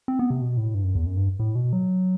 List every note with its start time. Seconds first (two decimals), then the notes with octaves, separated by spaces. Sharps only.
0.08 C4
0.19 B3
0.30 C3
0.41 B2
0.57 A2
0.74 G2
0.84 F#2
0.95 E2
1.06 F#2
1.17 G2
1.39 A2
1.55 B2
1.73 F#3